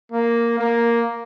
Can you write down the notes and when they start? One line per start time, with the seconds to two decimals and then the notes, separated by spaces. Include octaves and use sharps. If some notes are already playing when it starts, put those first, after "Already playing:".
0.12 A#3
0.59 A#3